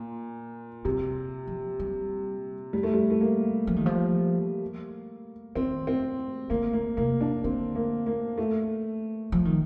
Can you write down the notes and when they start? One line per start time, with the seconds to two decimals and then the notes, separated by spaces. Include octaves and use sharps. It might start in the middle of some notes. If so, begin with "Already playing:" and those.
Already playing: A#2
0.85 C3 G3
1.47 F3
1.80 G3
2.73 G3
2.83 A3
2.94 G3
3.10 A3
3.21 A#3
3.67 F3
3.76 D#3
3.86 F3
5.55 D#3 C4
5.87 C4
6.50 D3 A#3
6.73 A#3
6.97 C3 A#3
7.21 D4
7.44 D3 C4
7.75 A#3
8.06 A#3
8.38 A3
9.32 F3
9.45 D#3